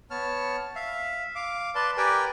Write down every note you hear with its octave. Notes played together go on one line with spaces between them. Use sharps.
B3 C#5 A5 F6
E5 F5
F5 D6
B4 D5 A5 C6
G4 A#4 B4 D5 G5 G#5